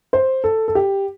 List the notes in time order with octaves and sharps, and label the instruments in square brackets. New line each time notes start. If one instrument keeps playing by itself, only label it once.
[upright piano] C5
A4
A4
G4